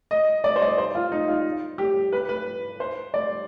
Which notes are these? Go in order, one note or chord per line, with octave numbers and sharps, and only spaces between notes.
D#5
D5
C5
D5
C5
F4
D#4
F4
G4
B4
B4
C5
D5